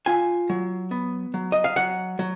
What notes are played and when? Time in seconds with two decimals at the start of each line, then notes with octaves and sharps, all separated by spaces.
0.06 F4 G#5
0.50 F#3
0.91 B3
1.34 F#3
1.52 D#5
1.64 F5
1.76 F#3 F#5
2.19 F#3